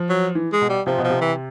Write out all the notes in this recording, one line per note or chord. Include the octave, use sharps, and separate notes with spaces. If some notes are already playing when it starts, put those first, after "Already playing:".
Already playing: F3
F#3
E3
G#3
B2
G3
C3 F3
B2
F3
C3
E3